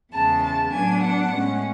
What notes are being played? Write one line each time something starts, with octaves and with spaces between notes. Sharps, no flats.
E2 C#3 G#3 A5
A5
A2 F#3 B3 D4 G#5
F#5
A2 G#3 C#4